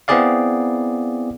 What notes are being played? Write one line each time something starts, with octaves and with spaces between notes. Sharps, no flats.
B3 C4 E4 G#4 D5 F5